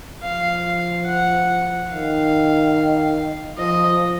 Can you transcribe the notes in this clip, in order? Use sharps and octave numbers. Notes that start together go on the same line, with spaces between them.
F3 F5
F#5
D#3 F5
F3 D#5